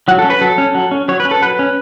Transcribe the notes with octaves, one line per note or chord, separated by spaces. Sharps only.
F#3 F#4
A4
C#4
B4
F#3 A4
C#4
F#3
C#4
F#3 C#5
B4
C#4
A4
F#3 B4
C#4